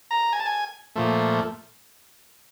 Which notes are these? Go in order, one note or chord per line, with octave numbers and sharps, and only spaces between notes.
A#5
G#5
A5
G#5
A#2 F3 A3